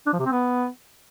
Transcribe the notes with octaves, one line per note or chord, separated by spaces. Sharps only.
D4
F3
C3
C4
B3